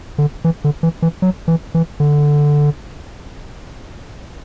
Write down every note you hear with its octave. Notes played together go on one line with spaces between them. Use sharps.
D3
E3
D3
E3
E3
F#3
E3
E3
D3